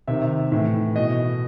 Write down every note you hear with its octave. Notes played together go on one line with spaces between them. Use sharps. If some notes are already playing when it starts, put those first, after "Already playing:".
C3 D#3 E5
A2 E3
B2 D#5